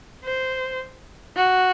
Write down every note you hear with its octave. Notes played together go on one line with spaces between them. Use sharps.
C5
F#4